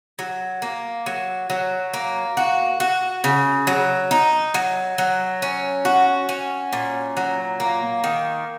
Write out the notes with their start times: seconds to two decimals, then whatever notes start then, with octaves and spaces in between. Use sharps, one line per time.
0.19 F#3
0.62 A#3
1.06 F#3
1.50 F#3
1.94 A#3
2.37 F#4
2.80 F#4
3.24 C#3
3.67 F#3
4.11 D#4
4.54 F#3
4.98 F#3
5.42 C#4
5.85 F#4
6.29 C#4
6.73 A#2
7.17 F#3
7.60 A#3
8.04 D#3